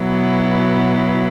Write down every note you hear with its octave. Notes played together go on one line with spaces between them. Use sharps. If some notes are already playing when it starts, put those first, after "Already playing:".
Already playing: B2 F#3 B3 E4